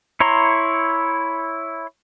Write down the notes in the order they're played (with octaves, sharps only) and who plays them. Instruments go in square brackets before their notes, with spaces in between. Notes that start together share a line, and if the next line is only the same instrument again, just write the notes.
[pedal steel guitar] E4 C#5 A#5 C6